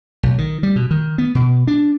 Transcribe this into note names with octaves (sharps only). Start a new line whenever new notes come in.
B1
D#3
G3
B2
D#3
B3
B2
D4